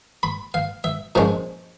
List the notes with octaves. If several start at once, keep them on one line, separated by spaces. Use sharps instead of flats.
B5
F5
E5
A#2 F3 G#3 C#4